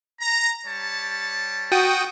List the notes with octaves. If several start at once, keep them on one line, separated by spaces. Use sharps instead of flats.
A#5
G3 C#5 A5
F#4 G5 D#6